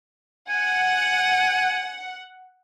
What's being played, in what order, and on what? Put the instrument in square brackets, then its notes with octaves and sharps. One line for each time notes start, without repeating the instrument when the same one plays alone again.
[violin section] F#5 [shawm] G#5